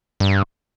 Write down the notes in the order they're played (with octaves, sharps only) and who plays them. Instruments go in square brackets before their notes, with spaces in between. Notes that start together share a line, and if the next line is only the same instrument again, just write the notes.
[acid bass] G2